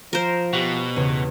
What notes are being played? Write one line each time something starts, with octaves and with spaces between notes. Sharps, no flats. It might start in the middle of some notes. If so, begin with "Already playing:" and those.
F3 A#4 C5
B2 G4 F#5
E2 C#3 C#4